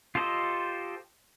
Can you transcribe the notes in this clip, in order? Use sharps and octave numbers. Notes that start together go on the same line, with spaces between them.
F4 G4 A4 C5 D#5